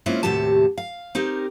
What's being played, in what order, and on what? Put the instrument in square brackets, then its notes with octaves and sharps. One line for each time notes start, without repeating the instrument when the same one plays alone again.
[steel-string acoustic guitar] G#3 A#3 C4 C#4 E4 F4
D#2 A2 C3 F#4 G4 A5
F5
C4 D#4 G4 A#4